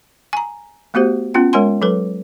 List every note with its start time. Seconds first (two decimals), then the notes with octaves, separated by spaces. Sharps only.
0.33 G#5 A#5
0.94 A3 B3 F#4 G4 C5
1.34 B3 C#4 F4 G5
1.53 G#3 A#4 C#5 F#5 G#5 C6
1.82 F#3 A4 B4